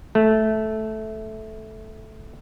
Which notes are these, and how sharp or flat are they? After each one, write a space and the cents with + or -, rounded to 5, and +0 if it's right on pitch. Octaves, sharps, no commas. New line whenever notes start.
A3 -10